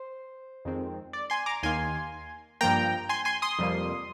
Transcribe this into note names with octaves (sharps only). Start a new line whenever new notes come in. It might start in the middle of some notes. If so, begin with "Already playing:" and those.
Already playing: C5
F2 D#3 G#3 C4
D5
G#5 C6
A#5 D6
D#2 D#3 A#3 G#5 C6
G2 F3 A#3 G5 A#5
G#5 C6
G#5 C6
C6 D#6
F2 C3 G3 A#3